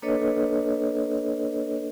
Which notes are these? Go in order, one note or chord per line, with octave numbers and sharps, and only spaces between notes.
A#3 D4 A4 B4 C#5 D#5